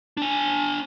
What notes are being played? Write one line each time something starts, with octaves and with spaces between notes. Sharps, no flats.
D4 G#5